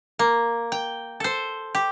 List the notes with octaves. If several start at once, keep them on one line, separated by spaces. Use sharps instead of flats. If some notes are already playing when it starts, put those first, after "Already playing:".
A#3
G5
A4 C5
G4